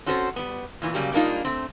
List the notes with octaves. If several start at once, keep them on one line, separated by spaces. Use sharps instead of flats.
C4 C#4 F#4 A4 C5
G3 B3
E2 A#2 E3
C#3 F#3 G3 A#3
G3 G#3 A#3 D4 D#4 F4
A3 C4